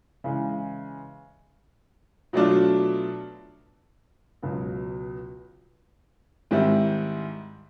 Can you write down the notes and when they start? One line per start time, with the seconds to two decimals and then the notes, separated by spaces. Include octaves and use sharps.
0.24 C#3 E3 G#3
2.33 B2 F#3 A3 D4 F4
4.42 C#2 B2 F#3
6.51 G#2 D#3 G3 C4 E4